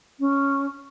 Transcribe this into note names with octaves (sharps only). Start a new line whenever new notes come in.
C#4